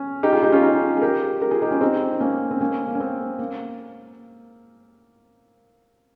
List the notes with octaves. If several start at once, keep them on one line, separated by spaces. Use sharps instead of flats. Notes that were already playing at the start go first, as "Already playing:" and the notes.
Already playing: C#4
D#4 G4
F4 G#4
D#4 G4
C#4 F4
D#4 G4
G#4
G4 A#4
G4 A#4
F4 G#4
D#4 G4
C#4 F4
C4 D#4
A#3 C#4
C4
A#3 C#4
A#3
C#4
C4
A#3